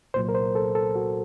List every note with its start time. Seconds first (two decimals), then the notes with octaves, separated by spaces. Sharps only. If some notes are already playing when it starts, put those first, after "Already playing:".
0.14 C2 A#2 F#3 C5
0.29 A#4
0.35 C5
0.55 A4
0.75 A4
0.95 F#4